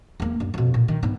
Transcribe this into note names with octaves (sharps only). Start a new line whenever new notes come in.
E2 A#3
F#2
F2 B2
A#2
D#3
G#2 B3